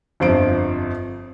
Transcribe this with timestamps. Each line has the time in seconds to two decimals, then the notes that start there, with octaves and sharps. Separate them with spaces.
0.20 G1 F2 F3 C5 D7